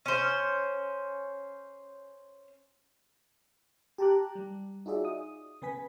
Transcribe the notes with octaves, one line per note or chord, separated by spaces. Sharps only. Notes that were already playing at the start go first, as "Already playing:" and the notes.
C#4 C5
G4 G5 A5 A#5 D6 F#6
G3
D#4 F4 F#4 G#4 D5 E5
D#6
C#3 B3 B4 G#5 B6